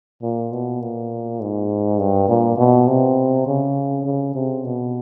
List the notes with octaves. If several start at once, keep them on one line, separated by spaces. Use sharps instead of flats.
A#2
B2
A#2
G#2
G2
A#2
B2
C3
C#3
C#3
C3
B2